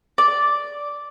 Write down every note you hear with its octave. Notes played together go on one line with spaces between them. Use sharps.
D5